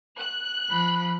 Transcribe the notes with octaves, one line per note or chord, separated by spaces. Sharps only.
F#6
F3 B5